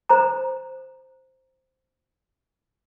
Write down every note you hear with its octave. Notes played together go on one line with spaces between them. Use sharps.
C5 A#5